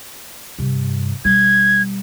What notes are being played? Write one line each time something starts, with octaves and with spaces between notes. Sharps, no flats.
G2 C3
B2 G3 G#6